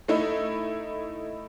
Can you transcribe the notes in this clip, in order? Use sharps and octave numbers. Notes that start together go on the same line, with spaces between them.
A3 D#4 E4